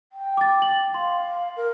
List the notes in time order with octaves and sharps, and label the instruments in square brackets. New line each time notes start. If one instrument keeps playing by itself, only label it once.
[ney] G5
[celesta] D6 A6
F#7
[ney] F5 [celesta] C6
[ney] A#4